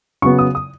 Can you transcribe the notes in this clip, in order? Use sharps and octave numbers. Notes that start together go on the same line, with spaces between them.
C#3 F#3 B3 C#6
D#6
D#6